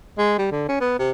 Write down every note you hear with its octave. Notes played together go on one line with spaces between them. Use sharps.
G#3
G3
D3
C#4
B3
C3